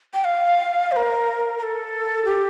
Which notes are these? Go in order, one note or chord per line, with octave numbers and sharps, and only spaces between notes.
G5
F5
C5
A#4
A#4
A4
G4